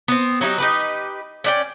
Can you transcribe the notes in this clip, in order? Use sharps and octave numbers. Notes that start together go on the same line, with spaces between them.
B3 C4
F#3 D#4 F4 G4
D#4 G4 B4
C#4 D5 G5